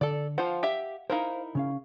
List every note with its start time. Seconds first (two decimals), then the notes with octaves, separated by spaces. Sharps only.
0.01 D3 A4 D5
0.38 F3 F4 C5 F5 F#5
0.63 G4 E5
1.10 D#4 E4 A#4 C5 F5
1.55 C#3 C#4 F5